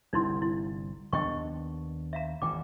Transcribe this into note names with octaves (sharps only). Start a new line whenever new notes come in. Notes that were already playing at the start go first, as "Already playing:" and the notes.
G1 C2 D#4 E4 C6
E4
D#2 B3 D4 D#5 G5 C#6
E5 F5 A#5
G#1 E2 G#2 G5 D6